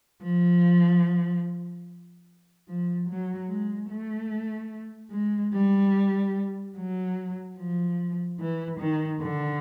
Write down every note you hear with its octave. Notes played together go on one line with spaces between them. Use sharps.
F3
F3
F#3
G#3
A3
G#3
G3
F#3
F3
E3
D#3
D3